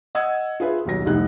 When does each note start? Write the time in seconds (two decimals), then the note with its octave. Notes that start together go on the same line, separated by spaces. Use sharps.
0.15 D#5 F#5 D#6 E6 G#6
0.60 F4 G#4 B4 E5
0.85 D#1 B1 A#6
1.06 F1 C2 D#4 F#6